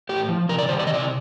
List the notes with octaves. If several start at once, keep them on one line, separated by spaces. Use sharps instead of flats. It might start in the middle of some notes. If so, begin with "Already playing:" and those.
A2 G4
F3
C3 A#4
D5
D#3 G3 C5
D5
D#5
C3 D5